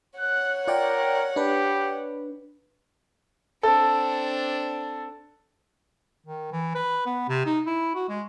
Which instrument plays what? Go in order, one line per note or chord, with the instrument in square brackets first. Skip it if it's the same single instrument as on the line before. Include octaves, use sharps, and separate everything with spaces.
[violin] C#5 F#5 [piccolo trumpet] F#6
[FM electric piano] F4 D5 G5 [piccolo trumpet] A#4
[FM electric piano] D4 B4 [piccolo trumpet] G4
[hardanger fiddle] C4 D4 [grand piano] A4
[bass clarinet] D#3
E3
B4
B3
C3
D#4
E4
F#4
G#3